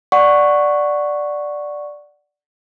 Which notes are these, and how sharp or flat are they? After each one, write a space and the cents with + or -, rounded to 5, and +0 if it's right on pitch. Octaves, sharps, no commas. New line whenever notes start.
D5 +0 F#5 +0 C#6 +0